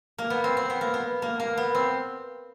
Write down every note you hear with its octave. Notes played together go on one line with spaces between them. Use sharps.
A#3
B3
C4
C4
B3
A#3
B3
A#3
A#3
B3
C4